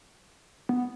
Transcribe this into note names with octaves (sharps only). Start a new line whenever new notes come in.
B3